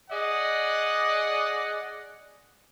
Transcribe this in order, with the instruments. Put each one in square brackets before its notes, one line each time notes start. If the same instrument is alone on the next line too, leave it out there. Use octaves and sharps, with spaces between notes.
[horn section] G#4 D5 D#5 F#5